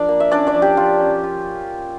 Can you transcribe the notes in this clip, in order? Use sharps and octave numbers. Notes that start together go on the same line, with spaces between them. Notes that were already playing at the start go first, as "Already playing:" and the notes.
Already playing: F3 D4 A#4 D5
A#3
E5
C#4 D4 D5
D4 D5
F3
G4
F3 F4
C#4
F4